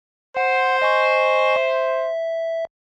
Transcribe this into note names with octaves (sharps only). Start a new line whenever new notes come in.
C5 F#5
D#5 G#5 C#6
E5